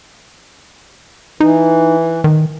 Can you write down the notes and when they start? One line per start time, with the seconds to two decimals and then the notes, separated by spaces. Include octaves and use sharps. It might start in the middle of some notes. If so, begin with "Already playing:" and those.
1.40 E3 D#4
2.24 D#3